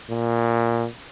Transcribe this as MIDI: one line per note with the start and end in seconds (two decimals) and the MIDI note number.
0.10 0.86 46